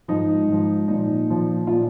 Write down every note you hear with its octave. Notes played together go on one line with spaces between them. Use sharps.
G#2 F3 D#4
G#2 F3
A#2 F3 D#4
A#2 F3
A#2 F3 F4